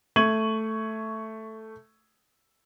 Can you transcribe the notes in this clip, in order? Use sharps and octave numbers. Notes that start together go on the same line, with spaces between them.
A3 C#6 G#6 D#7 F#7